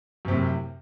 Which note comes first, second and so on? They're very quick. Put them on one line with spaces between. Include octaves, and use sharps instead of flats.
F#2 C3 A2